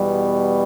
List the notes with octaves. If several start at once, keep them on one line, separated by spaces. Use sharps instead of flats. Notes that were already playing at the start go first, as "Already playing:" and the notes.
Already playing: E2 B2 G3